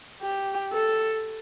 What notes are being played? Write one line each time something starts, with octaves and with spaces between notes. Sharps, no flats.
G4
A4